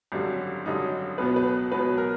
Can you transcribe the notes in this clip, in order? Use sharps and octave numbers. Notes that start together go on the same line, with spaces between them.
G#1 F#2 D3 G3
G#1 F#2 D3 G3 D#4
C#2 B2 F#3 B3 B4
B4
C#2 B2 F#3 B3 B4
A#4